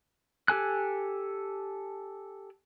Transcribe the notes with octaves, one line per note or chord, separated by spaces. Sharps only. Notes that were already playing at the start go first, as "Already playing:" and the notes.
G4 A4 G#5 F#6